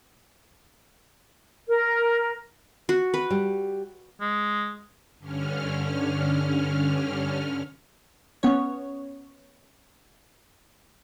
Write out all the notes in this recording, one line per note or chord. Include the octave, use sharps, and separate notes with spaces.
A#4
F#4
B4
G3
G#3
G2 D3 C#4 F6
B3 C#4 C#5